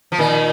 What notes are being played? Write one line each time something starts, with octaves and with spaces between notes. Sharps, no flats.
F3
A#2 D#3